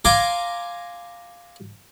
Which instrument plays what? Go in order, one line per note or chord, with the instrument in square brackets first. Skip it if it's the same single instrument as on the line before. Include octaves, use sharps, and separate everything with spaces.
[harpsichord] F5 G#5 A#5 C6 D6